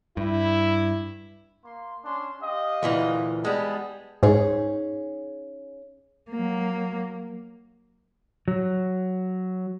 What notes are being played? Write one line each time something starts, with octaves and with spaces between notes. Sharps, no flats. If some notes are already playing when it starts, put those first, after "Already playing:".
G2 E4
A#3 C6
C#4 D4 C6
G4 D#5 F5
D2 A#2 E3
G3 G#3 B3 G#4 A5
G#2 C#4 D#4 G#4
F#3 A#3
F#3